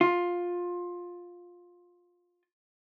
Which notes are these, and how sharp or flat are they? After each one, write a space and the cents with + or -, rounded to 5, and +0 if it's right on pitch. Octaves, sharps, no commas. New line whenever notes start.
F4 +15